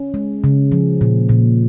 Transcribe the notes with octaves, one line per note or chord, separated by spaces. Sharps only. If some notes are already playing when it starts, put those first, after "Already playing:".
Already playing: C#4
G#3
C#3
F3
A#2
A#2